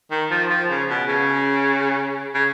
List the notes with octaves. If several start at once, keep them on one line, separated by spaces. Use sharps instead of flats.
D#3
F3
F3
C#3
B2
C#3
C#3